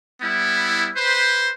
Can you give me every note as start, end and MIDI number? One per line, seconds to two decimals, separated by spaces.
0.21 0.90 55
0.21 0.90 59
0.21 0.90 64
0.96 1.50 71
0.96 1.50 72